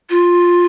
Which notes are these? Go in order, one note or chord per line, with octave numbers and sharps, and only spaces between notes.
F4